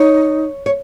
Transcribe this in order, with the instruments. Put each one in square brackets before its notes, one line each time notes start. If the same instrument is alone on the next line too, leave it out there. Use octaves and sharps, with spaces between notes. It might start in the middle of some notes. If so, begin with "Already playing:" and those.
Already playing: [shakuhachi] D#4 [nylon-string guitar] C#5
[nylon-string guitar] C#5